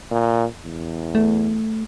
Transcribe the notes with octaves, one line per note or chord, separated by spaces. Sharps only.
A#2
E2
A3